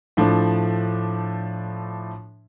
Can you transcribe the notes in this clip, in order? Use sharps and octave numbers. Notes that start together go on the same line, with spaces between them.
A2 F3 A3 D4